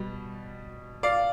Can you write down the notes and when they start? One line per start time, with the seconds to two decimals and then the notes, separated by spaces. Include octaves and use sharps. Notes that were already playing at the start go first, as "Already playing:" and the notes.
Already playing: B2 G3
1.03 D5 F5